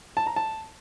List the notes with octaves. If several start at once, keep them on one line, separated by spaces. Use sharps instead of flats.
A5
A#5
A5